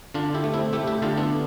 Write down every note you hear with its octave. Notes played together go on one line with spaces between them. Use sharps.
D3 D4 F4
E4 G4
A3
C4 E4
A3 E4 G4
E4 G4
D3 F4 A4
B3 D4